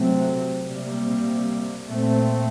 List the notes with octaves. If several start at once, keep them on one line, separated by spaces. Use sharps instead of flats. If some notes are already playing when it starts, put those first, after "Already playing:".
Already playing: C3 F#3 A3 C4
C3 G3 A#3
A#2 A3 C4